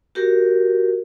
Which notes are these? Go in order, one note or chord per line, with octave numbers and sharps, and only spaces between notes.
F#4 G4 A#4